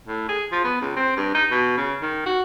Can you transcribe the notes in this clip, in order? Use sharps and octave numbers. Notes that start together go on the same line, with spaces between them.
A2
G#4
F3
B3
C#2
C4
G2
D#4
B2
C#3
D#3
F#4